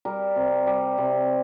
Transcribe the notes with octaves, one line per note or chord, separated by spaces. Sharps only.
G3 A#4
C3
G3
C3